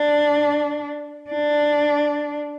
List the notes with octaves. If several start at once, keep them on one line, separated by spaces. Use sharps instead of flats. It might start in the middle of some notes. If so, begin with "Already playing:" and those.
Already playing: D4
D4